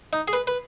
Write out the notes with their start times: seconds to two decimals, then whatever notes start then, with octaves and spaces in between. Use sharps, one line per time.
0.13 D#4
0.28 G#4
0.33 B4
0.47 B4